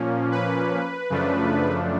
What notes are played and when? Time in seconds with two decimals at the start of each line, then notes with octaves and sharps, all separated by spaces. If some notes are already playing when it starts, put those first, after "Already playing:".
Already playing: A#2 F3 A#3 C#4
0.32 B4
1.10 F#2 C#3 F3 A3 D4